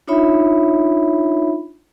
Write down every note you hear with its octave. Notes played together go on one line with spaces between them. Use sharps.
D4 D#4 F4 C#5 E5 B5